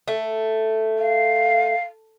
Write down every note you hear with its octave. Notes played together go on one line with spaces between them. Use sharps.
A3
F5